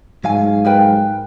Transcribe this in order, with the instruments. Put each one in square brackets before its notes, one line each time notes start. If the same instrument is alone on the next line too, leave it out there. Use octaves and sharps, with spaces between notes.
[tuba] G#2 [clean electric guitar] F#3 F5 G#5
[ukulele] A#4 B4 G5